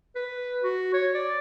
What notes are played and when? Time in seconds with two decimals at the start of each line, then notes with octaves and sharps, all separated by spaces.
0.16 B4
0.64 F#4
0.93 C#5
1.14 D5